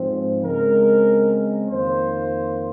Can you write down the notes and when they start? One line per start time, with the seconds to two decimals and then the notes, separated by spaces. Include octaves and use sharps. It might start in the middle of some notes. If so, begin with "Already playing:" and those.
Already playing: G#2 F3 C4
0.43 C#3 G#3 C4 A#4
1.69 F2 D#3 A#3 C5